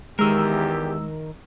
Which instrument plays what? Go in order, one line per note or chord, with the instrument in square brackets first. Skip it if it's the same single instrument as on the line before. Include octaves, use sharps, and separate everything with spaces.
[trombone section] E2 G4 [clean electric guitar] D#3 A#4 [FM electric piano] G#3 E6